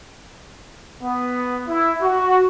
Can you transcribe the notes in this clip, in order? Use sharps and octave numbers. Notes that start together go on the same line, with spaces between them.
B3
E4
F#4